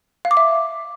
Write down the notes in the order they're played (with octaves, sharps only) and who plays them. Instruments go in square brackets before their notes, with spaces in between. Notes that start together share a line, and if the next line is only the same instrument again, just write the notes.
[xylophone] F5
D6
E5